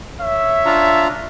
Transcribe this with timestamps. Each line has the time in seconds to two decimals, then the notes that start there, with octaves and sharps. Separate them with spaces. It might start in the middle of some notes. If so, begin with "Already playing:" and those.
0.20 C#5 E5
0.66 D4 F4 A#5